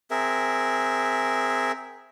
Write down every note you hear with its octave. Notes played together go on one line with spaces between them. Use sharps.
C4 G#4 A#4 E5